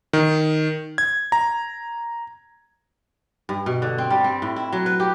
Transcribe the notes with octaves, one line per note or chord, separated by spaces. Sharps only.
D#3
G#6
A#5
G2
B2
D3
C4
G3
C4
A2
E4
F#3
B4
G4